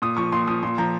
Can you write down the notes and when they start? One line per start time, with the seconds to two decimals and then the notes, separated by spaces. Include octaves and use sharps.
0.02 A#2 D#6
0.17 F3 C#6
0.32 A#2 C6
0.47 F3 D#6
0.63 A#2 C6
0.78 F3 A#5